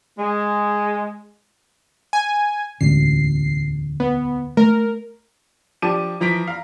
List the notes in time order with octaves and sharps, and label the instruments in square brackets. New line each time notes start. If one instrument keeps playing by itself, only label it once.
[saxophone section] G#3
[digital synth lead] G#5
[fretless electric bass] E1 A1 D2 [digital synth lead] C7
[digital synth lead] B3
[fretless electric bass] A3 [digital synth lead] A#4
[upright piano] F3 D4 G4 A5 D6 D#7
E3 F3 A#5 B6 D7
F5 A#5